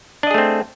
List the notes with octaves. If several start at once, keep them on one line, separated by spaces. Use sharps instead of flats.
A3 C4 D4 G#4 D#5